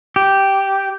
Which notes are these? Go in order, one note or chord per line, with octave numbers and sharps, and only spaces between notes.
G4